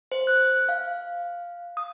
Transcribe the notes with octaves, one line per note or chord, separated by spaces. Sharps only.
C5
F#6
F5
D#6